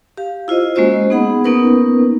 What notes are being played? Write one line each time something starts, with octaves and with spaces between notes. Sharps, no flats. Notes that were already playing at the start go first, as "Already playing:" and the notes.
G4 F5
E4 F4 C5 D#5
G#3 A#3 C#4 F#4 C5 D#5
B3 D#4 G#4 F#5 B5
A#3 B3 C#4 D#4 A#4 B4